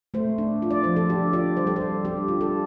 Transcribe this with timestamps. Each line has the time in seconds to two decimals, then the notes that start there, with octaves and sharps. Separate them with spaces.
0.14 A3 C5
0.38 D4
0.62 F4
0.71 D5
0.84 F3 C5
0.96 A4
1.10 D4 G4
1.33 F4 D5
1.57 G3 C5
1.67 A4
1.76 C5
1.81 G3
2.05 D4 G4
2.28 F4
2.41 A4